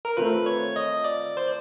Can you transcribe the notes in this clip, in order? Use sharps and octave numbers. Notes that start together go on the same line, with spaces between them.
A#4
A3 C4 F4 A#4 B4
C#5
D#5
D5
C5